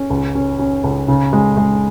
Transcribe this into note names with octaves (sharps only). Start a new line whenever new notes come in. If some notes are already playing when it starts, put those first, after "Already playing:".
Already playing: C#4
C#2
C#4
C#4
C#2
C#3
G#3
G#3